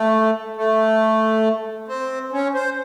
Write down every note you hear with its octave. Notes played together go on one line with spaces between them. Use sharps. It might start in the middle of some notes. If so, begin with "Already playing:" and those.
Already playing: A3
A3
C4
C#4
C5